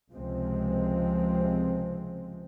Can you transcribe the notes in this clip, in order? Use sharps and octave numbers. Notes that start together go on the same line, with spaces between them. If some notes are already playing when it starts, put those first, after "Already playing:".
C#2 C3 F3 G#3 C4